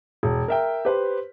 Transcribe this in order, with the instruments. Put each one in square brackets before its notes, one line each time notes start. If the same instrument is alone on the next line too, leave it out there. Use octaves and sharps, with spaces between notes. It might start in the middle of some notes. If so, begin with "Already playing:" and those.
[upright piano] E1
A#4 E5 G5
G4 B4 C5